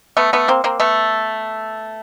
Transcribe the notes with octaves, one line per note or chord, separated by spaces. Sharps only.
A3 B3
A3 B3
A#3 C4
A#3 C4
A3 B3